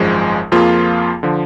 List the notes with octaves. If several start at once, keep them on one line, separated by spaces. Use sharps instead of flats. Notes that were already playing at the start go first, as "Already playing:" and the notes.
Already playing: G#1 F#2 F3 G#3
F2 F3 A#3 F4 G#4
D3 F3